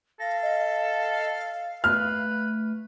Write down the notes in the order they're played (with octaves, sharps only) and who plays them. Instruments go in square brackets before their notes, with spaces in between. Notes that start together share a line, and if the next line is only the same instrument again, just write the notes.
[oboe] A4 [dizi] F5 [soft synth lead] A#6
[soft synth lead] D#5
[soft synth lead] A3 [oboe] B4 [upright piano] F6